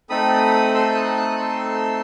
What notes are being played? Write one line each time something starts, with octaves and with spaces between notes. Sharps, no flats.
A3 C4 D#4 A4 B5 D#6
C6 E6
G6
D#6 F#6
D#6 F#6
D#6
C6 E6